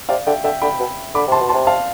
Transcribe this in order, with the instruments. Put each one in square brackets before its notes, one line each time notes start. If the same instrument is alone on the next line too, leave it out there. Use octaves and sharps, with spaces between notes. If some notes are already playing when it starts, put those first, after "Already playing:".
[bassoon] C3 [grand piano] D5 F5
[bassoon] D3 [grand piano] E5 G5
[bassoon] D3 [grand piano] E5 G5
[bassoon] D3 [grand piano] G5 B5
[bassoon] B2
[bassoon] D3 [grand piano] B5 D6
[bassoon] C3 [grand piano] A5 C6
[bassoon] B2
[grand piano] A5 C6
[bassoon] C3
[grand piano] F5 A5